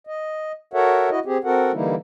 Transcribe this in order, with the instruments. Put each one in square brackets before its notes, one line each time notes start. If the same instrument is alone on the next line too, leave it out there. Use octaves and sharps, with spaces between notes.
[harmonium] D#5
F#4 A4 A#4 C#5 E5 F#5
E4 F#4 D#5
C4 G4 G#4
C4 F#4 A4 A#4 F#5
D3 E3 G3 A#3 D#4 E4